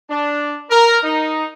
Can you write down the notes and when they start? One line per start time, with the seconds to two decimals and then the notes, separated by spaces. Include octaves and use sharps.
0.10 D4
0.70 A#4
1.03 D#4